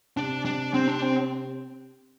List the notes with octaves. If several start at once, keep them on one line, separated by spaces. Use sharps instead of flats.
C3 D4
D4
C4
D4
C4